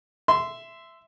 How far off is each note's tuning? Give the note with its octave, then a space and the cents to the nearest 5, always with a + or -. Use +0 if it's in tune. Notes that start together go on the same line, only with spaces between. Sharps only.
E5 +5 C6 -15